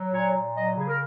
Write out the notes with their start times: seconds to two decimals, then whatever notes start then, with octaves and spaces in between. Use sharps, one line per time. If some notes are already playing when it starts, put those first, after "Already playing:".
Already playing: F#3
0.12 A#2 C#5
0.34 A#2
0.54 F#3 D#5
0.76 C#3 G#4
0.88 A#4